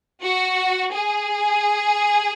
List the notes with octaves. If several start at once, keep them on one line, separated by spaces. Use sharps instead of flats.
F#4
G#4